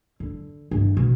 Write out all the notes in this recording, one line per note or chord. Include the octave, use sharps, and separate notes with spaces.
D3
G2 D#3
B2